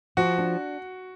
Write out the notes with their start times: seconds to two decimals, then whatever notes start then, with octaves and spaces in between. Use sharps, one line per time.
0.17 F3 F#4
0.38 D4